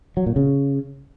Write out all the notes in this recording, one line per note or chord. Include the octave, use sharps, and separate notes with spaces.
F#3
A#2
C#3